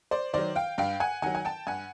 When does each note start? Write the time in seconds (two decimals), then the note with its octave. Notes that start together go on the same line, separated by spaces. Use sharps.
0.11 C5 D5
0.33 D#3 F#3 C5 D5
0.56 F5 G5
0.78 G2 F5 G5
1.00 F#5 G#5
1.22 D#3 F#3 F#5 G#5
1.35 G#5
1.45 G5 A5
1.67 G2 F#5 G#5